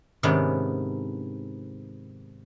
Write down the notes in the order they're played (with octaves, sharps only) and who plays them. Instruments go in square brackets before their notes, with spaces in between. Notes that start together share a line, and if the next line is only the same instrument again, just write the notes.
[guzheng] G#2 C3 D#3 B3 C#4 D4